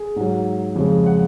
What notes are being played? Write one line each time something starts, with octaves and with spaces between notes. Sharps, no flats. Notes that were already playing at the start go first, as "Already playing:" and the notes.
Already playing: G#4
G#2 F#3
F2 C#3 G#3
F#5